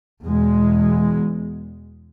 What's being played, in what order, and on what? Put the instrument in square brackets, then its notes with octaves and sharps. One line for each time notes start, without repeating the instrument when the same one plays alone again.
[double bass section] E2 B2 G#3